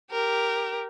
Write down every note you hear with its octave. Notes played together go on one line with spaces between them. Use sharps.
G4 A#4